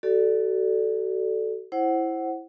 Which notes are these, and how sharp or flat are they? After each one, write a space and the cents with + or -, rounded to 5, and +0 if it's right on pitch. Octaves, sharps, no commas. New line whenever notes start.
F#4 +35 A4 +0 D5 +0
E4 +0 C5 +20 F#5 +15